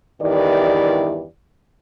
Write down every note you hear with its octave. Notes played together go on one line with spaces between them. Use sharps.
E2 G2 D#3 E4 G4 D5